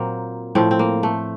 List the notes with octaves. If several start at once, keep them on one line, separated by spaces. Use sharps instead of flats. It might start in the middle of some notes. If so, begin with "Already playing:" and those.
Already playing: A#2 F#3 A#3 C4
A2 F3 C4
C4
A#3
A3